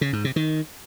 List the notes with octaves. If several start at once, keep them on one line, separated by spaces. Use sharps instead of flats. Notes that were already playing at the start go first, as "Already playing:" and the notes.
C#3
G#2
C3
D#3